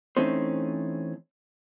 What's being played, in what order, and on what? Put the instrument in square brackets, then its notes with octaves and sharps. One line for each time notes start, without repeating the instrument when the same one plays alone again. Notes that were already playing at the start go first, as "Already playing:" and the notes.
[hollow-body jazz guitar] E3 A3 C4 C#4 D#4 C5